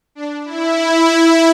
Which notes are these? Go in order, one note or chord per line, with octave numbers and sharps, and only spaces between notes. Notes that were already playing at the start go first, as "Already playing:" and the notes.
D4
E4